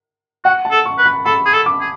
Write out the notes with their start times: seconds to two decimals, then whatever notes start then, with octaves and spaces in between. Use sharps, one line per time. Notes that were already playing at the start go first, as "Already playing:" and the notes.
0.44 F#4 F#5
0.65 A5
0.71 A4
0.86 C#6
0.98 B4
1.06 B5
1.26 A4 B5
1.45 G#4
1.53 A4
1.66 D6
1.81 G#4